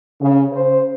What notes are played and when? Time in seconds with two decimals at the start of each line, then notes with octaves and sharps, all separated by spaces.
0.21 C#3
0.51 C5